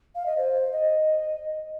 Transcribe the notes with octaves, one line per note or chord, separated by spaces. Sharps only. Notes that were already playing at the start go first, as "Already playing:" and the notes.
F5
D#5
C5
D#5